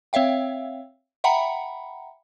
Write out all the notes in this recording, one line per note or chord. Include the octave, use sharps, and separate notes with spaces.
C4 C#5 E5 F5 G5
E5 F#5 G5 A#5 B5 C#7